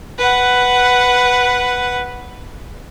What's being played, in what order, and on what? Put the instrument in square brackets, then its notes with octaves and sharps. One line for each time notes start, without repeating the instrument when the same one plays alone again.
[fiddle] B4 F#5